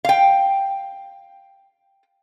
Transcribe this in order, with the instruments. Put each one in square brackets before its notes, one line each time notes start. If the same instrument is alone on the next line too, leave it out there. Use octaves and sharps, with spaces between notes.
[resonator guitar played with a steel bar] F5 G5